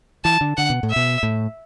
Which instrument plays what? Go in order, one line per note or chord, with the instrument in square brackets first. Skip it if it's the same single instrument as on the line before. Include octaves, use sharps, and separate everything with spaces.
[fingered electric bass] E3 [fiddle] A5
[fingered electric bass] D3
[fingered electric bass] D3 [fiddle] F#5
[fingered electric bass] B2
A2
[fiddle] E5
[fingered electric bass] B2
A2